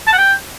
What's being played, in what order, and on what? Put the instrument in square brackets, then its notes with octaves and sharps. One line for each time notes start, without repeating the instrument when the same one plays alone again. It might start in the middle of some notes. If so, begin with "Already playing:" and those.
[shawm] A5
F#5
G5